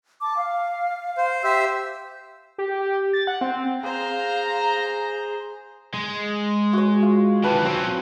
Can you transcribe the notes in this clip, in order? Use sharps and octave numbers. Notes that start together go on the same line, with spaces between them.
A5 D6
F5
C5
G4 C5 E5 E6
G4
A6
F#5
C4
G#4 C5 F5 A#5
G#3
F#4 C#5
F4
D#3 E3 B4 A5
F#3 C4 C#4